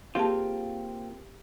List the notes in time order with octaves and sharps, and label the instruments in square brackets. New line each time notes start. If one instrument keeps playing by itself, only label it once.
[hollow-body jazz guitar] A#3 C4 F4 [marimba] G4 G#4 A5